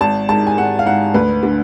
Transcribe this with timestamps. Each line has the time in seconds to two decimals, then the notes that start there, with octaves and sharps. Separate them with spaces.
0.01 G#1 A5
0.29 G#2 A5
0.47 G#5
0.58 G#1 F#5
0.79 F5
0.86 G#2 F#5
1.14 D2 B4
1.43 D3